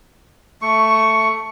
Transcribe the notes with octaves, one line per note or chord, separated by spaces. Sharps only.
A3 C#6